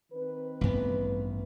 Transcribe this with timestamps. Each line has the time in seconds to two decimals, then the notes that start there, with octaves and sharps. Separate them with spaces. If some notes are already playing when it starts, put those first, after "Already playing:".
0.12 D#3 C4 B4
0.61 A1 G2 B3